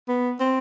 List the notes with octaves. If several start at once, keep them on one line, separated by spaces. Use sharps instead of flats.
B3
C4